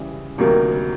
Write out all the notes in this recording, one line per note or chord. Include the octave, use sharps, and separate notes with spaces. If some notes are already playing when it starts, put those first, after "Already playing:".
Already playing: C#3 E3 G3
D2 C3 D#3 F#3 A#3